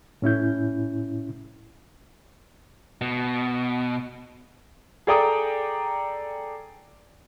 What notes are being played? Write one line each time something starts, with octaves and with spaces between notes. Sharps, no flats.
A2 C#4 E4 G6
B2
G#4 A4 D5 G5 A#5 D#6